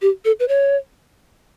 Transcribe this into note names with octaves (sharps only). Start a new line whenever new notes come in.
G4
A4
B4
C#5